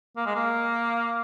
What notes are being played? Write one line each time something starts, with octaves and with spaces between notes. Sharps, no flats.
A#3
G#3
A#3